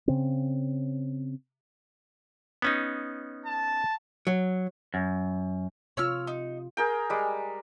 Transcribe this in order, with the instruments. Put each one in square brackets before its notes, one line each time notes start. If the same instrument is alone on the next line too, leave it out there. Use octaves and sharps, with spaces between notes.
[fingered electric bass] C#3 C4
[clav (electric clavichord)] B3 C#4 D#4
[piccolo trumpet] A5
[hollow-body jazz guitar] F#3
[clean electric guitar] F#2
[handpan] C3 F4 [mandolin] C#5 E6 F6
[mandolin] D#4
[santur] G#4 A#4 G5
G3 G#3